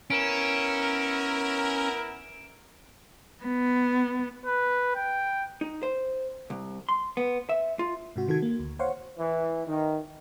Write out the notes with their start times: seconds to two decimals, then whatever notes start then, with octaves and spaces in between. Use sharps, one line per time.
0.10 B3 C#4 E4 A#4 D7 E7
3.43 B3
4.46 B4
4.95 G5
5.61 D#4
5.83 C5
6.50 C2
6.89 C6
7.17 B3
7.49 E5
7.79 F4
8.16 G#2 C3 F#4
8.28 C3 D#3 F#4 A4 G#6
8.42 A#3
8.59 D2
8.79 C5 C#5 F5 F#5 C6 C#6
9.18 E3
9.67 D#3